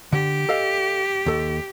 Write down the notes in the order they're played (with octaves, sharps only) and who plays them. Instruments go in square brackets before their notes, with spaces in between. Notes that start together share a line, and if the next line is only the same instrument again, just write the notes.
[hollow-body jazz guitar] D3 [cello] G4
[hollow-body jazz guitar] A4 D#5 F5
D#2 A4